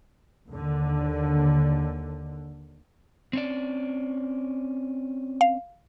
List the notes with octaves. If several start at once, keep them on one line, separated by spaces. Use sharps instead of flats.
D#2 D3
C4 C#4 D5
F5